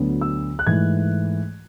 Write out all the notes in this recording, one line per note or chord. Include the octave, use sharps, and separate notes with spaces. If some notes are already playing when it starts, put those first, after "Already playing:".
Already playing: D2 D3 F#3 B3
E6
F#6
G#2 E3 A3 G#6